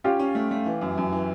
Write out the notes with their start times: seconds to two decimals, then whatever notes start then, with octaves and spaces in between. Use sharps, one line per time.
0.04 C#4 F4 G4
0.19 C#4
0.35 A3
0.51 A3
0.66 E3
0.81 F#2
0.97 F#2
1.12 E3